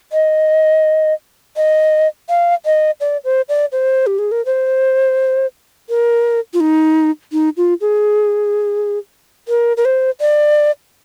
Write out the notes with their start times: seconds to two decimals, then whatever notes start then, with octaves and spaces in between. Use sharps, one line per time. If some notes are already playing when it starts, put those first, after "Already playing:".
0.13 D#5
1.57 D#5
2.29 F5
2.65 D#5
3.01 D5
3.25 C5
3.49 D5
3.72 C5
4.07 G4
4.19 G#4
4.32 A#4
4.45 C5
5.89 A#4
6.54 F4
6.60 D#4
7.33 D#4
7.57 F4
7.81 G#4
9.48 A#4
9.77 A#4
9.85 C5
10.21 D5